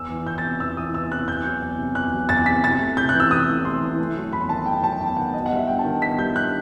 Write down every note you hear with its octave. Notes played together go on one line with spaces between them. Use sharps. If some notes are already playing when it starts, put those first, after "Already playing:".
Already playing: E2 E6
E3
E2 G6
A6
C3
E2 E6
E3 D#6
E2 E6
C3 F#6
E2 G6
F#3
E2
C3
E2 F#6
F#3
E2 A6
C3 B6
C3 A6
A3
C3 G6
E3 F#6
E6
C3 D#6
A3
C3 C6
E3
A3
F#3
E2 B5
D#3 A5
A3 G5
F#3 A5
E2 G5
D#3 F#5
B3 D#5
F#5
G3
E5
G2 G5
A5
D#3
B3 B6
G3 G6
G2 F#6